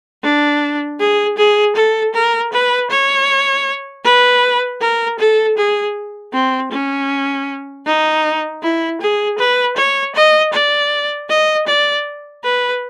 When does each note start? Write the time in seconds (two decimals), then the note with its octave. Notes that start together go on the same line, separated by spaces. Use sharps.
0.23 D4
1.00 G#4
1.38 G#4
1.76 A4
2.14 A#4
2.52 B4
2.90 C#5
4.04 B4
4.81 A#4
5.19 A4
5.57 G#4
6.33 C4
6.71 C#4
7.86 D#4
8.62 E4
9.01 G#4
9.38 B4
9.76 C#5
10.15 D#5
10.53 D5
11.29 D#5
11.67 D5
12.44 B4